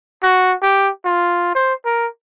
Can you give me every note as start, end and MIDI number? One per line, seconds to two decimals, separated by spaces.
0.23 0.54 66
0.62 0.90 67
1.05 1.55 65
1.55 1.74 72
1.85 2.07 70